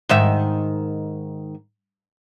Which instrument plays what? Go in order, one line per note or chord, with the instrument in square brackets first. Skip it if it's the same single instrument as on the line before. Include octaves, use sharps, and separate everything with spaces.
[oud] G#2 D#3 E5